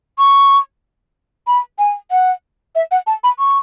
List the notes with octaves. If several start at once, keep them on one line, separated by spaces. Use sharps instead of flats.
C#6
B5
G#5
F#5
E5
F#5
A5
B5
C#6